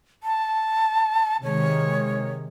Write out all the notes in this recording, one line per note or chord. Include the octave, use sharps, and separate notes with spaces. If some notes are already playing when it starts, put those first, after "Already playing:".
A5
C3 D#3 G#3 C#5